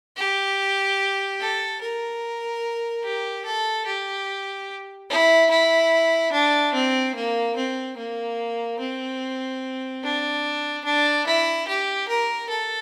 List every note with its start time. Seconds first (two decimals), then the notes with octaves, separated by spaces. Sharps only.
0.16 G4
1.40 A4
1.81 A#4
3.04 G4
3.45 A4
3.86 G4
5.10 E4
5.51 E4
6.33 D4
6.74 C4
7.15 A#3
7.56 C4
7.97 A#3
8.80 C4
10.03 D4
10.85 D4
11.27 E4
11.68 G4
12.08 A#4
12.49 A4